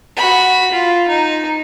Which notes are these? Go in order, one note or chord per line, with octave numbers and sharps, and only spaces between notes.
F#4 B5
F4
D#4